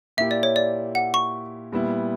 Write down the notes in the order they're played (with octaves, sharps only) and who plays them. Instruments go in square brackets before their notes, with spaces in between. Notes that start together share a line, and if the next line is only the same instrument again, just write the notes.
[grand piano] A#2 A#3 E4 G4 [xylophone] E5
[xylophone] D5
C#5
D5
F#5
C#6
[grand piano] A#2 G3 B3 E4